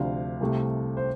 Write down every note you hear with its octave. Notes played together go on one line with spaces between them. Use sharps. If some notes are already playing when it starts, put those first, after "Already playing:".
Already playing: D2 C3 F3 D4 F5
C2 C3 A3
C5